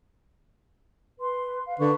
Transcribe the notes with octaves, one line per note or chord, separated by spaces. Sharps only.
B4 C6
F5
D3 D4 B4 C#6